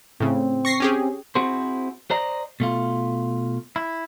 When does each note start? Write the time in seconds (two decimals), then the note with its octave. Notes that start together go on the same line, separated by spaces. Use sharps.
0.20 A2 C#3 C4
0.65 C#6 A#6 C7
0.80 C#4 G4 G#4
1.35 C4 E4 F#4 G#4 C5
2.10 C5 D5 D#5 A#5
2.60 B2 A3 F4
3.76 E4